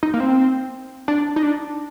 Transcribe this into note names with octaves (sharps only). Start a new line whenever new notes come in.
D#4
A#3
C4
D4
D#4
D4